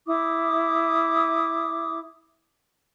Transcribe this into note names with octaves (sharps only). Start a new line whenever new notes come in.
E4 D6 D#6